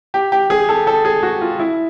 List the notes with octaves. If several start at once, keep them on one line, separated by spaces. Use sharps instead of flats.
G4
G4
G#4
A4
A4
G#4
F#4
F4
E4